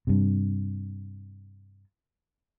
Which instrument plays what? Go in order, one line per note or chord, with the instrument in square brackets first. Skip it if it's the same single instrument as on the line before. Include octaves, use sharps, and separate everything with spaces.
[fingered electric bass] G2 C3